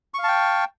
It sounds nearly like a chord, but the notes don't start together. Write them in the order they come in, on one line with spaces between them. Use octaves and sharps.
C#6 F5 A5 G5